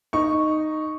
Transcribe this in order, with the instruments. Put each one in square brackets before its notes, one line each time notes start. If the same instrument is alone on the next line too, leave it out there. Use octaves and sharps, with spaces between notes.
[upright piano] D#4 C#6